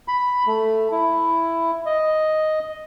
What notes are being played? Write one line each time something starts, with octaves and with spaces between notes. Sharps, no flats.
B5
A3
E4
D#5